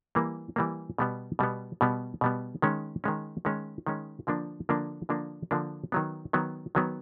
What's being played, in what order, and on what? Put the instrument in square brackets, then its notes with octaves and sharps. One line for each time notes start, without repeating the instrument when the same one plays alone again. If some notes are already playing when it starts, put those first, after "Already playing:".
[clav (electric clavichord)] E3 G3 A#3
E3 G3 A#3
B2 G3 B3
B2 G3 B3
B2 G3 B3
B2 G3 B3
D#3 G#3 C#4
D#3 G#3 C#4
D#3 G#3 C#4
D#3 G#3 C#4
D3 F3 A#3 D4
D3 F3 A#3 D4
D3 F3 A#3 D4
D3 F3 A#3 D4
D#3 F#3 B3
D#3 F#3 B3
D#3 F#3 B3